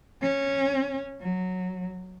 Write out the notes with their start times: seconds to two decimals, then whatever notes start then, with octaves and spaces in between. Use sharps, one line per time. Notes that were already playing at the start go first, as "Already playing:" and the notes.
0.22 C#4
1.21 F#3